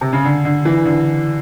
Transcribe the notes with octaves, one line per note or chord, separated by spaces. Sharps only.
C3
C#3
D3
D3
E3
D3